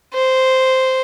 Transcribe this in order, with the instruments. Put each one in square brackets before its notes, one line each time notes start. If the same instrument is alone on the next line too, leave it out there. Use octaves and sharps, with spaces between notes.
[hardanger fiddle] C5